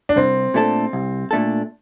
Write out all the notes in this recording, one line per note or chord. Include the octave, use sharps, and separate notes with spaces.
D4
C2 C4
A#2 A3 D4 A4
C2
A#2 A3 D4 A4